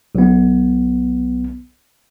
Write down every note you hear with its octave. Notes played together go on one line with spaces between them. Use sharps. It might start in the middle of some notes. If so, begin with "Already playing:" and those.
B1 B3